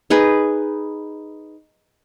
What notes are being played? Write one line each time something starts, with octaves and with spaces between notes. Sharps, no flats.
D#4 G#4 B4